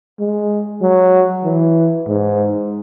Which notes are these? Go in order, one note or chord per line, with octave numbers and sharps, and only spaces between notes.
G#3
F#3
E3
G#2